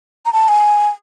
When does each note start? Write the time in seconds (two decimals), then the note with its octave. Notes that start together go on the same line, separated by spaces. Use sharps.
0.25 A#5
0.33 A5
0.48 G#5